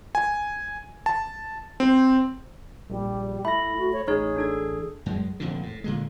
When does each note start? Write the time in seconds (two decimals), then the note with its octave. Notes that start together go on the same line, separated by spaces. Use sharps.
0.15 G#5
1.06 A5
1.80 C4
2.90 A#1 G3
3.45 A3 E4 B5 A#6
3.78 F#4
3.93 C#5
4.08 A1 D#4 G#4 C#5
4.36 D4 A4 G#6
5.06 F#2 G#3
5.40 F1 F2 A#2 D3
5.63 A2
5.84 A#2 D3 G#3